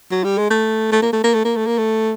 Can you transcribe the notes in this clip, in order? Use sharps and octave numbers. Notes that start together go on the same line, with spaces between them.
F#3
G3
G#3
A3
A3
A#3
A3
A#3
A3
A#3
A3
A#3
A3